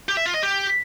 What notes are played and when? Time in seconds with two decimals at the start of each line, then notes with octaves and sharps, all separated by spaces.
0.09 G4
0.17 E5
0.26 F4
0.34 D#5
0.43 G4